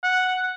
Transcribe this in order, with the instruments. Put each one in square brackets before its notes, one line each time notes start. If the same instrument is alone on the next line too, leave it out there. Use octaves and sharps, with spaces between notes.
[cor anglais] F#5